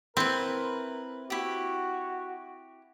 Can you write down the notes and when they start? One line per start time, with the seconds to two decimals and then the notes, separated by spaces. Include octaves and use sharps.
0.17 C4 E4 A#4 B4
1.30 E4 F#4 G4